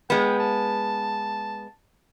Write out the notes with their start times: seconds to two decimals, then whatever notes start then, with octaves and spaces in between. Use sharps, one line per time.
0.10 G#3 B3 G5
0.39 A5